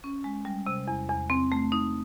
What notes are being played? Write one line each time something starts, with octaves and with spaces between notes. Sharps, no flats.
C#4
G#3
G3
C3
E2
E2
C4
A3
D#4